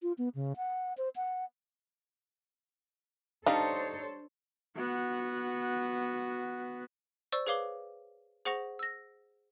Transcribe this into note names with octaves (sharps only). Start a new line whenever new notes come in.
F4
B3
C#3
F#5
C5
F#5
G3 D4 D#4 A4 C5 C#5 F5
B3 F#4
C5 D5 C#6 E6
G#4 B4 C#5 F5 D6 G7
G#4 C5 F#5 C#6 A#6 F7
E6 A#6